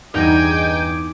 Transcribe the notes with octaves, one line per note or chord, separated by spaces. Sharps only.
E2 G2 D#4 G5 G#5 D6